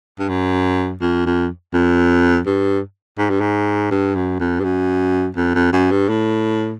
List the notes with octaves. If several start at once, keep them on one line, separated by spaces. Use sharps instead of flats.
G2
F#2
F2
F2
F2
G2
G#2
G2
G#2
G2
F#2
F2
G2
F#2
F2
F2
F#2
G2
A2